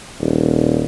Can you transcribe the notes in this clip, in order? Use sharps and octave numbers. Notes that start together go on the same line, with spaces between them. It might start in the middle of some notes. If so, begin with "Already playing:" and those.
D#1